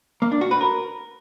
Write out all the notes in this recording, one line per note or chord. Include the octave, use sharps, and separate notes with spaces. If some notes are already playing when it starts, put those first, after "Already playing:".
A#3
D4
F#4
B4
A#4